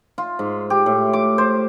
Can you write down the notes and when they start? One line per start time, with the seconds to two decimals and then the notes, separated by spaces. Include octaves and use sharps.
0.18 F4
0.39 G#2
0.70 G4
0.86 A2
1.13 D6
1.38 C5